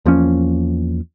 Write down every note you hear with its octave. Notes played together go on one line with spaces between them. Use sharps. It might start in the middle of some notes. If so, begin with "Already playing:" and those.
E2 F3 A#3 C#4